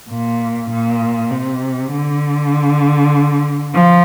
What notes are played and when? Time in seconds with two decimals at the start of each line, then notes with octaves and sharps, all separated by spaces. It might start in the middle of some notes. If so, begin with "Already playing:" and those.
0.09 A#2
0.70 A#2
1.31 C3
1.92 D3
3.74 F3